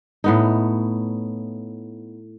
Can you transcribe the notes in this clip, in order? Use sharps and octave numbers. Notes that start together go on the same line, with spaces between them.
A2 B3 D#4